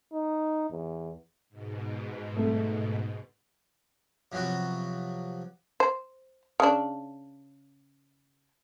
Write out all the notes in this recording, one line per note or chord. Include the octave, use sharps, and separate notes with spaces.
D#4
E2
G#2 B2
A3
C3 F3 F#3 B3 F#4
C5
C#3 D4